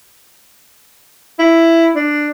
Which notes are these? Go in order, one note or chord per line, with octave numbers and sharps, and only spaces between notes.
E4
D4